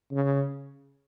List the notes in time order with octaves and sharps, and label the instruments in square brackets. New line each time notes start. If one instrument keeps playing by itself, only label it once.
[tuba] C#3